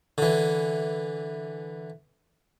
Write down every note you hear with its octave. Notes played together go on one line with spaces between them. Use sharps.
D3 E3